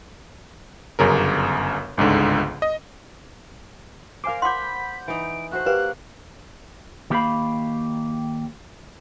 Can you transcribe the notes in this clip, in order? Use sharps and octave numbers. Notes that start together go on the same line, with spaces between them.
G1 F#2 C#3 A#4
G1 C#2 G#2 D3
D#5
A#4 C5 F5 G#5 D6 C7
F#5 B5 C6 D6 G6 B6
E3 D#4 D7
A3 F#4 C5 F#6
A#3 G4 B4
D#3 A#3 G4 A4 F5 B5